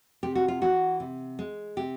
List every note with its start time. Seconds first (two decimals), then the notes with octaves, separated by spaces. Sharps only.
0.23 C3 G4
0.35 F#4
0.48 F4
0.61 E3 F#4
1.00 C3
1.39 G#3
1.77 C3 G4